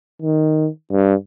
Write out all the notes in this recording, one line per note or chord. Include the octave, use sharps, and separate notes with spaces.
D#3
G2